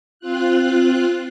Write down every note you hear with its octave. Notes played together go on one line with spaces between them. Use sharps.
C4 F4 F#6